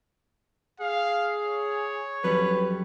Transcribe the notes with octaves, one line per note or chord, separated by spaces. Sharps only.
G#4 F5
C#5
F2 F#3 G3 B4